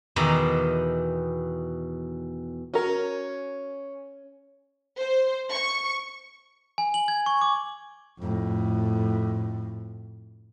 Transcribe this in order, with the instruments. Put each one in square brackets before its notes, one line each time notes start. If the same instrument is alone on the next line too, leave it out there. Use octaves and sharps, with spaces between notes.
[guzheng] E2 B2 D#3 D5 A#5
[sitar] C#4 [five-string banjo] F#4 A#4
[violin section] C5
C#6
[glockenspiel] G#5
F#7
G#6
C#6
D6
[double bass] F2 A2